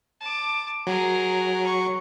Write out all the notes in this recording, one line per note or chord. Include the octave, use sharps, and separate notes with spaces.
A5 D6
F#3 G#4 A#4
C#6